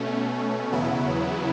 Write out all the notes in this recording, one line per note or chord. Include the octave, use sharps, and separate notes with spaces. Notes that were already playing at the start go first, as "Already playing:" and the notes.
Already playing: B2 A3 C#4
E2 C#3 F#3 B3 E4